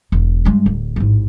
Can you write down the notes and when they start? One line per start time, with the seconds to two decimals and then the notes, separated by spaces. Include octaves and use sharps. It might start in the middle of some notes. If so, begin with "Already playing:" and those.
0.12 E1
0.45 G2 G#3
0.66 D1
0.96 A1 G#2